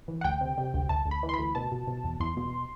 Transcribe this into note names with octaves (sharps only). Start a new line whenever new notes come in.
E3
F#5
D2 G5
C3
C3
D2
D2 A5
D2
B5
E3
C6
D2 B5
B2 A5
B2
B2
E2
E2 C6
B2